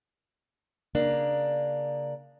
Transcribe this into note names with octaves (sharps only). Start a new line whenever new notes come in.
C#3 A#3 D4